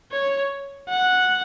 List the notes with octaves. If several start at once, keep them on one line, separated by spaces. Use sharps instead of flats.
C#5
F#5